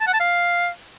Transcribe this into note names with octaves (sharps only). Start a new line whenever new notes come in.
A5
F#5
A5
F5